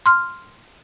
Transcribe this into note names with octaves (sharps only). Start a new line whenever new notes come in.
C6 F6